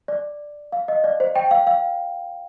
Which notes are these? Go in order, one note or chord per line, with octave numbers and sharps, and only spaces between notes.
D5
F5
D#5
D5
C5
G5
F5
F5